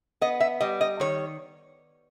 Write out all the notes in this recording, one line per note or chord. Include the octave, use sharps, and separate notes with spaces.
B3 D#5
E5
G3 D#5
D#5
D#3 C#5